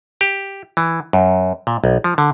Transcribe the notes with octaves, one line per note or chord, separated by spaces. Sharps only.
G4
E3
F#2
A#2
B1
F3
D3